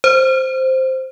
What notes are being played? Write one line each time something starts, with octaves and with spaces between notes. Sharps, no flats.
C5